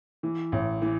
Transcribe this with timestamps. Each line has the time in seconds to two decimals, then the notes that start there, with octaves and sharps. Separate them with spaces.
0.23 E3
0.52 A1
0.82 E3